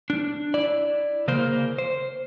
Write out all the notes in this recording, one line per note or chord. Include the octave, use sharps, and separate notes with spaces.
D4
E4 D5
C#3 A#3 C5
C5